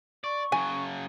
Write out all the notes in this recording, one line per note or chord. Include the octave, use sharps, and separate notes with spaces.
D5 C#6
C#3 F#3 G#5